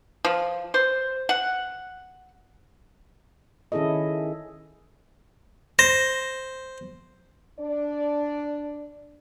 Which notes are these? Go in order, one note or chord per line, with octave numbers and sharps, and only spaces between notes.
F3
C5
F#5
D#3 C#4 E4 G#4 A4 D#5
C5 A#6
D4 D5